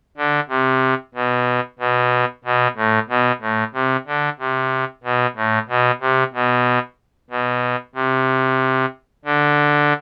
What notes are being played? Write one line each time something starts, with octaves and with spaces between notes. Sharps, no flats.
D3
C3
B2
B2
B2
A2
B2
A2
C3
D3
C3
B2
A2
B2
C3
B2
B2
C3
D3